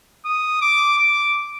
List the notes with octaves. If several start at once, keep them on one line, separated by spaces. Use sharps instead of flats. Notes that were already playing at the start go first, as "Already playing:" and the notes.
D#6
D6
D6